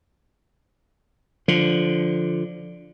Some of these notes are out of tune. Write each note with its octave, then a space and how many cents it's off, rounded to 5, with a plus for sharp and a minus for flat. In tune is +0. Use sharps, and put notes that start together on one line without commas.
D3 +0 F3 +0